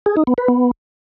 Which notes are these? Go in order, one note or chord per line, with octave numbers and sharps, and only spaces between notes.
G#4
D#4
B3
B4
B3